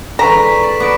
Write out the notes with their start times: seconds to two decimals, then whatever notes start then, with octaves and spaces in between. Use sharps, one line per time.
0.19 D3 E3 G#3 A#5 C#6 B6 E7
0.43 B6
0.63 D5
0.80 B3 D#4 F#4 D6 D7